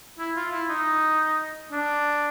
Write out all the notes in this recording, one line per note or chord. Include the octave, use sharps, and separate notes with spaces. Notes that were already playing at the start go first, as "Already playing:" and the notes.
E4
F4
E4
D#4
D4